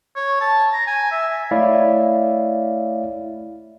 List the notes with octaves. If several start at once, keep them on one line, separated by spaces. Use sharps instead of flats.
C#5
A5
A#5
G#5
E5
A3 E4 C#5 D5 E5 F5